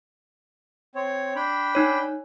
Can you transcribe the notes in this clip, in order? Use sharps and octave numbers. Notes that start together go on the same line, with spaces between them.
C4 C#5
D4 G5 B5
D#4 C#5